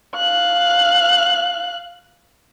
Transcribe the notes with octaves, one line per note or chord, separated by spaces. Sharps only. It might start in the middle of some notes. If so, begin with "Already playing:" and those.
F5 F#6